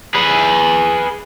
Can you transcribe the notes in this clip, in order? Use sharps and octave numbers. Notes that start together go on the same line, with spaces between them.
G#4 B4